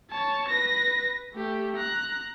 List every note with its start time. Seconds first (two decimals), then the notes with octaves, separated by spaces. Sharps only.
0.11 C#5 A5
0.49 B4 A#6
1.34 A3 G4
1.76 A#5 F#6